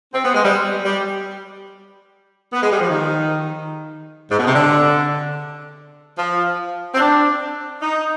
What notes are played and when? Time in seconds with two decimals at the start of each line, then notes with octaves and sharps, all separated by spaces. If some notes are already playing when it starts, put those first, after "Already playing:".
0.14 C4
0.25 B3
0.34 G#3
0.44 G3
0.85 G3
2.53 B3
2.62 G#3
2.72 G3
2.80 F3
2.90 D#3
4.30 G#2
4.38 B2
4.46 C3
4.54 D3
6.17 F3
6.94 C4
7.00 D4
7.82 D#4